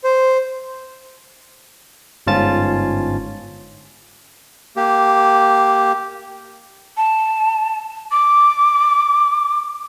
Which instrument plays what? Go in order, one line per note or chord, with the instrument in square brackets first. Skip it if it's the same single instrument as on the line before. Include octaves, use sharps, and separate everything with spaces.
[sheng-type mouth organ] C5
[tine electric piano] G1 G#2 C#4 F4 A5 A6
[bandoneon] A#3 G4
[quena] A5
D6